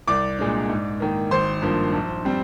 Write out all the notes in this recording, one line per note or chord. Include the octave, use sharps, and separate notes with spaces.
C2 D5 D6
A#2 G#3 D4
G#2
D#3 A#3
G#1 C5 C6
G2 F3 A#3
A#1
G3 C4